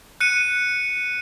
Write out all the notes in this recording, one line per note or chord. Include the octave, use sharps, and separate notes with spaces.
F#6 C#7 D#7